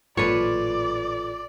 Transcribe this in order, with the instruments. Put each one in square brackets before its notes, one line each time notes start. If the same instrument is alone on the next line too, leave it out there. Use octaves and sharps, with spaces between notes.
[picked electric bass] A1 A#2 F#3 [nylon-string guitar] F4 A4 B4 [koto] C#5 [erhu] D5